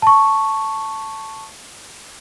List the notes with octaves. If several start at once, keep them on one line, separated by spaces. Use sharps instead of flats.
A5 C#6